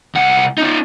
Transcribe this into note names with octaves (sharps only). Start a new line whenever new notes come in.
C2 F#5
C#4 D#4